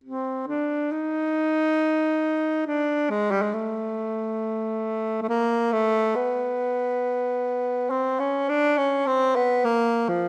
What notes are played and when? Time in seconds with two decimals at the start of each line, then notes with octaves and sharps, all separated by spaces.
0.04 C4
0.48 D4
0.92 D#4
2.66 D4
3.10 G#3
3.31 G3
3.42 G#3
3.53 A3
5.22 A3
5.29 A#3
5.73 A3
6.16 B3
7.90 C4
8.20 C#4
8.49 D4
8.78 C#4
9.06 C4
9.36 B3
9.65 A#3
10.08 F3